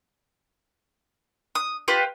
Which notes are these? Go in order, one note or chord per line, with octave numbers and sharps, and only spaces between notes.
D#6
F4 G4 B4